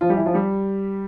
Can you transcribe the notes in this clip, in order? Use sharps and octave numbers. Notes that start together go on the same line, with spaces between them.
F3 F4
G3 G4
E3 E4
F3 F4
G3 G4